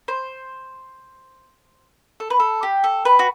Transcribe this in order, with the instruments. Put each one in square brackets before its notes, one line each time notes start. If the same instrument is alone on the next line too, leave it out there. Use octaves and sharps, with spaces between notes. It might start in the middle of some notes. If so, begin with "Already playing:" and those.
[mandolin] C5
A4
B4
A4
G4
A4
B4
F#4